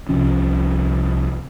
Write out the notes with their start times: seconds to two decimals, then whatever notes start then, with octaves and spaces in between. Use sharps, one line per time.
0.09 C2 C3 F3 C#4